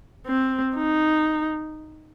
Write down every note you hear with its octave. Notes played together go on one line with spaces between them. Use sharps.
C4
D#4